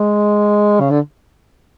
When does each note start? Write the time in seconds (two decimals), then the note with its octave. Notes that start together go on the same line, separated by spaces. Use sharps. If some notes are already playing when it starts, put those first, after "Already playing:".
Already playing: G#3
0.80 C#3
0.90 D3